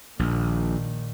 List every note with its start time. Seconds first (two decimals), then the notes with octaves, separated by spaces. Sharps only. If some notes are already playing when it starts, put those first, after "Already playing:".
0.19 A#1 A#2 D#3